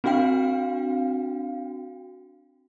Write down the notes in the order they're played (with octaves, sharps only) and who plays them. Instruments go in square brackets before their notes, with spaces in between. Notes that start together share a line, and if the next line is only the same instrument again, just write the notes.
[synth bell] C4 D4 F#4 F5 G5